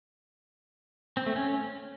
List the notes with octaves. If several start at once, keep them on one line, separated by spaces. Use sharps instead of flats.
C4
A3
C#4